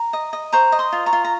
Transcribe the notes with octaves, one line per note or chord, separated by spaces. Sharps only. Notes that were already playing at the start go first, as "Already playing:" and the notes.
Already playing: A#5
D#5
D#5
C5 A#5 C#6
D#5
C6 D#6
F4
A#5 C#6
F4
A#5